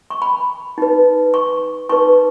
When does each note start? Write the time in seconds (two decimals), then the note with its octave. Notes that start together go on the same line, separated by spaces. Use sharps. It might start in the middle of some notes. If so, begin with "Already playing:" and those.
0.10 C#6
0.22 B5
0.78 D#4 B4
1.34 C#6
1.89 D#4 B4 C#6